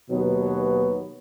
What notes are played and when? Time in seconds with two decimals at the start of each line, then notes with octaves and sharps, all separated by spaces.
0.11 D#2 B2 F#3 B3